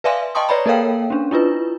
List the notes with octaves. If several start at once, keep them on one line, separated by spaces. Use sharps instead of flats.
B4 D5 E5 F5 G#5 C6
D#5 G5 A5 C6 C#6 D#6
B4 C#5 D5 A#5 B5
A#3 A4 A#4 C#5 F5 G5
C#4 D4
D4 E4 F4 B4